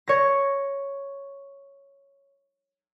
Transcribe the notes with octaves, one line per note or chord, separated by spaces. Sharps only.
C#5 A#6